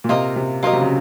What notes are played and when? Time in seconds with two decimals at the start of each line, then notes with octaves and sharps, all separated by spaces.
0.04 A#2
0.09 C3 A#3 F4 A#4 D#5
0.36 C3
0.63 F#3 A#3 F4 A#4 D#5
0.73 C3
0.81 C#3